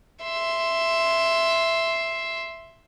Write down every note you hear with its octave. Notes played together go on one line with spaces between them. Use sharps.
E5 C6